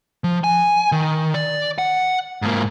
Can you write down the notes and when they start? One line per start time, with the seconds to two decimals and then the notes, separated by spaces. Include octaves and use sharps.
0.24 F3
0.44 G#5
0.92 D#3
1.34 D5
1.78 F#5
2.42 G#2 A#3